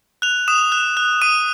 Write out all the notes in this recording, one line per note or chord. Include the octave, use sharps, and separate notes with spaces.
F#6 F7
D#6 E7
F#6
F#6
D#6 D#7